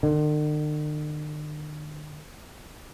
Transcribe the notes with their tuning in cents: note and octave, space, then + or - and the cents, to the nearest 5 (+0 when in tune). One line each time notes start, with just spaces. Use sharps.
D3 +45